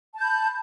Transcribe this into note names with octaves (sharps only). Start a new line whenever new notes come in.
A5 B5 G6